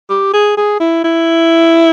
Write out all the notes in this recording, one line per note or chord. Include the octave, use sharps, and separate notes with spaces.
G4
G#4
G#4
E4
E4